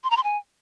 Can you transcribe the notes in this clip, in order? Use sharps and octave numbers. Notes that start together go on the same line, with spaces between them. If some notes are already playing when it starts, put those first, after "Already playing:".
C6
A#5
C6
G#5